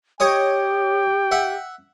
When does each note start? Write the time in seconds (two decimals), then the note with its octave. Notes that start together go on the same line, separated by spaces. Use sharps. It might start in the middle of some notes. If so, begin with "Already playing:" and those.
0.20 G4 C#5 D#5 G5 D#6
1.31 E5 F#5